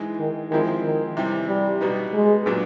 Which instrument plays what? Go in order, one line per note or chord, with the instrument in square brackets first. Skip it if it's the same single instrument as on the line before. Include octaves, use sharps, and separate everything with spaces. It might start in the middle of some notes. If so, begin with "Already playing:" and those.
Already playing: [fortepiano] G#2 E3 G#3
[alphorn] D#3
[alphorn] D#3 [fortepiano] F3 G#3 C4 E4
[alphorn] D#3
[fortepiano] C3 E3 G3
[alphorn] G3
[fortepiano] B2 G3 B3 D#4
[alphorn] G#3
[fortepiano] A#2 F#3 B3 D4